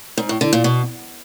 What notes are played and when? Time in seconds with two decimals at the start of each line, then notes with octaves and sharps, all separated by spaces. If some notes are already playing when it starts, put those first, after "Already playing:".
0.18 G#2
0.29 A2
0.41 D3
0.53 A#2
0.64 B2